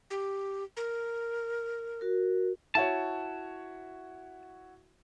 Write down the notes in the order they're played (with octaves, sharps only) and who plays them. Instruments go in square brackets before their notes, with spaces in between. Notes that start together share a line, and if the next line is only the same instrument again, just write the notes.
[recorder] G4
A#4
[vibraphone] F#4 A#4
[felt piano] E4 F#4 C#5 [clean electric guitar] A5